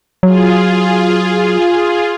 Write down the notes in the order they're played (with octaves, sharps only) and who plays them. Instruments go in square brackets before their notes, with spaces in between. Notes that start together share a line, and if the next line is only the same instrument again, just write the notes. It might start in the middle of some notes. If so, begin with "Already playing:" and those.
[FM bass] F#3 [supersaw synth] F4 G#4